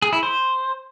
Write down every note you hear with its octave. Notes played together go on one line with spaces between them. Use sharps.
G#4
E4
C5